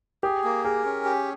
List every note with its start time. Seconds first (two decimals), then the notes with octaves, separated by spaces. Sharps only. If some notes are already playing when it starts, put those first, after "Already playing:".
0.23 G4 G#4
0.44 A#3
0.64 G#4 A#4
0.85 C#4
1.04 G4